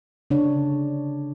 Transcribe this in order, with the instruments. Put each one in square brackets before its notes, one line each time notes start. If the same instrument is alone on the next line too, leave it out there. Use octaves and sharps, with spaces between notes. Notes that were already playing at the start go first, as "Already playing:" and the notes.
[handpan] C#3 D4 C#5